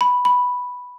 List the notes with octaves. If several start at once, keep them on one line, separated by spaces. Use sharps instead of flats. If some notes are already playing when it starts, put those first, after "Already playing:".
B5
B5